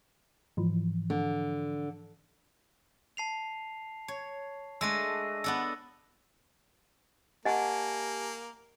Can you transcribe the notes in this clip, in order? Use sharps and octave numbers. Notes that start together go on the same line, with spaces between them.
G#2 E3 F3
D3
A5 C7 F7
C#5
G#3 A3 D4 E6 A#6 D#7
B3 D4 A4 E6 A6
A#3 G4 D#5 F#5 G#5 A5